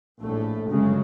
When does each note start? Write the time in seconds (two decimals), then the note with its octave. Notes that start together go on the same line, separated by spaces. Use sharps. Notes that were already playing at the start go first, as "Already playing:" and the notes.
0.21 A#1 A2 A3
0.70 G1 F#2 C#3 G#3